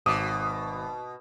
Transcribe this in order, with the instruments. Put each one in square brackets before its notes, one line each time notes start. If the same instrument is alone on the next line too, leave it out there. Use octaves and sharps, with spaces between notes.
[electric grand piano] G#1 D6 D#6 [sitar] B2